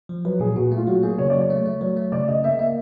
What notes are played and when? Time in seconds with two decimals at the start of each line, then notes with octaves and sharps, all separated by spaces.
0.09 F3
0.25 F#3 B4
0.40 A#2 G#4
0.55 A#2 F#4
0.72 A3
0.77 F4
0.87 F#3 F#4
1.03 A#3 G#4
1.18 C#3 C#5
1.30 D5
1.34 F#3
1.39 C#5
1.50 A3
1.66 A3
1.81 F#3 C#5
1.97 A3
2.12 C#3 D5
2.28 C#3 D#5
2.44 A#3 E5
2.59 A#3 E5